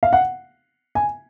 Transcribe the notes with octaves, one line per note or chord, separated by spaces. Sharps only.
F5
F#5
G#5